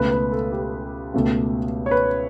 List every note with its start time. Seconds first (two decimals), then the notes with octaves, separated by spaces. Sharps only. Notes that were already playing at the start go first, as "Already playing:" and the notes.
Already playing: C#2 B2 A3 B4
0.11 B4
0.32 A4
0.52 G4
1.14 C#2 B2 A3
1.86 C#5
1.91 B4